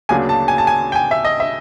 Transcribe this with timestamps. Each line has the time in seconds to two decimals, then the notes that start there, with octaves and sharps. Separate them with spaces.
0.09 D2 C#3 F#3 A#3 D4 G#5
0.29 A5
0.48 G#5
0.58 A5
0.67 G#5
0.92 G5
0.96 G#5
1.11 E5
1.25 D#5
1.40 E5